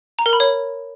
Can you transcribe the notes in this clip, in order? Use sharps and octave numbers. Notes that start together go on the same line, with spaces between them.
A#5
A#4
B5
C#5